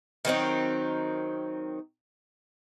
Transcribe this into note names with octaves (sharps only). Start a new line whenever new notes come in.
D#3 F#3 C4 D#4